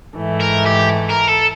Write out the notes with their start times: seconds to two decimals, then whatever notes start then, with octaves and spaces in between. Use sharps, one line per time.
0.15 G#2 E3 A3
0.41 A#4
0.66 G4
1.10 A#4
1.29 A4